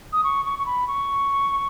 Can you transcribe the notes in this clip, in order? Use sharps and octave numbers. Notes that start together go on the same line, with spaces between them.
D#6
C#6
C#6
C#6
B5
C#6